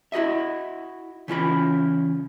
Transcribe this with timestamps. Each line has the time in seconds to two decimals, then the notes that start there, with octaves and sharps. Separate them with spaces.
0.12 E4 F#4 D#5 E5
1.28 C#3 E3 F4 B5